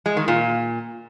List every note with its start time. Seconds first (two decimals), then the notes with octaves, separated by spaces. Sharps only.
0.06 G#3
0.17 D#3
0.28 A#2